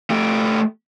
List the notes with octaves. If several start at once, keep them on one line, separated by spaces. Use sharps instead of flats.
A3 G4